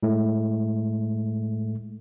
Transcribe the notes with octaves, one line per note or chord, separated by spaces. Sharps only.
A2 G#3 A3